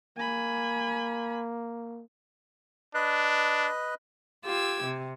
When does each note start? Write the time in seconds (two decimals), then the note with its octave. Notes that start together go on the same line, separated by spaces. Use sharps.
0.17 A#3 G#5 B5
2.95 D4 B4 D#5 F#6
4.44 F4 G4 E6 G#6
4.83 C3